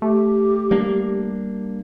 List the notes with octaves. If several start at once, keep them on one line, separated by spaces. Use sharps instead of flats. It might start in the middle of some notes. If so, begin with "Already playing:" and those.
A3 G4
G3 A#3 D4